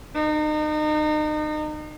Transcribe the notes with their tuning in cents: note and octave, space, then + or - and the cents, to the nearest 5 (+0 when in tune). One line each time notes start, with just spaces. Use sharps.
D#4 -35